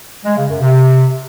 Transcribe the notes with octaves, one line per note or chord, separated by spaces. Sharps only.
G#3
C#3
F#2
C3